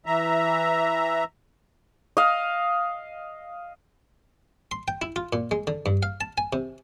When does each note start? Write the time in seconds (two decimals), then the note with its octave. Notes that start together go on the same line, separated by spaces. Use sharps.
0.06 E3 E5 A#5
2.17 D#5 F5
4.71 C6
4.88 G5
5.02 E4
5.16 F4
5.33 A#2
5.51 G#3
5.67 D3
5.86 G2
6.03 F5
6.21 A5
6.38 G#5
6.53 C3